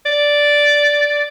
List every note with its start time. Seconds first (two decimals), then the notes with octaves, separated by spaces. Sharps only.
0.06 D5